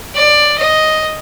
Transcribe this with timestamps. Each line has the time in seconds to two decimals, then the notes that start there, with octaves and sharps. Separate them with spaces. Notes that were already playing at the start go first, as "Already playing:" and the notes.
0.15 D5
0.58 D#5